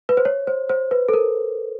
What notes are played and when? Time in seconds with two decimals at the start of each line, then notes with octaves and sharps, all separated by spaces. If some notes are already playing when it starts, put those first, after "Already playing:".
0.09 B4
0.17 C5
0.25 C#5
0.47 C5
0.69 C5
0.91 B4
1.09 A4
1.13 A#4